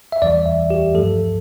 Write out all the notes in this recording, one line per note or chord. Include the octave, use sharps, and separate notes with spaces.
E5
E2 E3 G3 D5
E5
G4
G2 F3 A3 A4